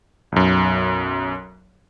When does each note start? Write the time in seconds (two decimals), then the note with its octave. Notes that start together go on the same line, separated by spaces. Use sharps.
0.32 B1 F#2